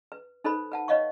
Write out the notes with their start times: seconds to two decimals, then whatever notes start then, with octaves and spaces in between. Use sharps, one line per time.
0.12 B4
0.44 D#4 A4 B4 C5 B5
0.72 B4 F#5 A5
0.88 B4 C#5 D#5 F5 C#6